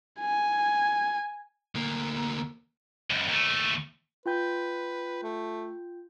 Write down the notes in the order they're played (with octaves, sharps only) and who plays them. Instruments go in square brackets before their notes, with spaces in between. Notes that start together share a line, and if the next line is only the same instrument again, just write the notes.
[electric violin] G#5
[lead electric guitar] D2 A#3
[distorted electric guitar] C#2 F#2
D#2 A3
[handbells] F4 G5 G6 [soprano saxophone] B4
[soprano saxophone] A3